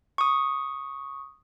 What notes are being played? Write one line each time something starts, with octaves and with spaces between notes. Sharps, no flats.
C#6 D#6